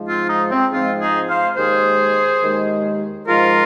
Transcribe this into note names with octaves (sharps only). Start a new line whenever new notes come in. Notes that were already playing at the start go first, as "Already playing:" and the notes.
Already playing: G#2 F3 G#3
C4 F4
D#4
C4
G#2 F3 G#3 C4 F4
D#4 G#4
C5 F5
D#2 D#3 G#3 G#4 C5
D#2 D#3 G#3
G#2 F3 G#3 F4 A#4